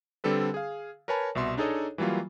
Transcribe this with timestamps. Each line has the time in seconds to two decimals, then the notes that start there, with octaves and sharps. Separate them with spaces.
0.24 D3 G3 C4 A4 B4
0.54 G#4 F5
1.08 A#4 B4 C#5 G#5 A5 B5
1.35 C2 B2 E5 C6
1.57 D4 D#4 G#4 A4 C#5 D#5
1.98 E3 F#3 G3 A#3 F4